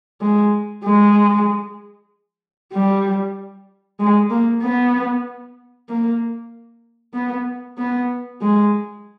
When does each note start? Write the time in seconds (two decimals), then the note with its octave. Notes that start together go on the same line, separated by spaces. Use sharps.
0.21 G#3
0.84 G#3
2.74 G3
4.00 G#3
4.30 A#3
4.63 B3
5.89 A#3
7.14 B3
7.78 B3
8.41 G#3